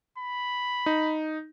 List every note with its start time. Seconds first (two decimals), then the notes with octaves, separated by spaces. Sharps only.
0.18 B5
0.86 D#4